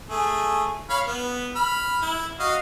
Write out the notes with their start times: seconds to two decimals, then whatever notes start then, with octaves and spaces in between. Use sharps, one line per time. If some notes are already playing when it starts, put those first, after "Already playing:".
0.10 A3 G#4
0.90 C#5 F5 B5
1.06 B3
1.55 B5 F6
2.02 E4
2.39 F#4 D#5 F5